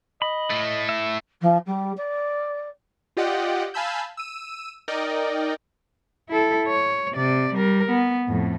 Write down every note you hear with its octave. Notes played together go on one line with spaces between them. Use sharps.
D#5 B5
A2 A3
E5
F3
G3
D5
F4 G4 D5 D#5 F#5 G5
F5 G#5 A5 B5 E6 G6
E6 D#7
D#4 A#4 D5 D#5 G5
E4 A4
C#5
C3 D5
G3 A#4
B3
F2 A2